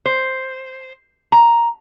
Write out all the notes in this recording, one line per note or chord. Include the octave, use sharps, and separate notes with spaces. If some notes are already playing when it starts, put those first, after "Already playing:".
C5
A#5